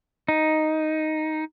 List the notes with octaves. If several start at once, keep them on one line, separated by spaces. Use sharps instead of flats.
D#4